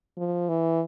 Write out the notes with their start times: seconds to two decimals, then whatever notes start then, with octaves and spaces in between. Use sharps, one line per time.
0.18 F3
0.49 E3